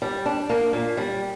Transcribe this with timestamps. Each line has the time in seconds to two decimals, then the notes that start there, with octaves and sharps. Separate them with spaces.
0.02 G3
0.26 D4
0.49 A#3
0.73 A#2
0.97 G3